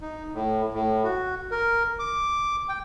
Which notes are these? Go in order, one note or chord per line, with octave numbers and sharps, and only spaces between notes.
D#4
A2
A2
F#4
A#4
D6
G5